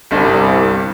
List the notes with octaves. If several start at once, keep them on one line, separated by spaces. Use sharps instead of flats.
G1 C2 G2